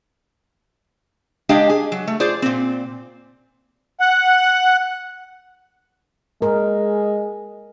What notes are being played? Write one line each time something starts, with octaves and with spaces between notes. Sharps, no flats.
G#3 D4 G4 D#5 F5
G#4
F#3
A3
F4 G#4 C5 D5
A#2 C4
F#5
G#3 A#4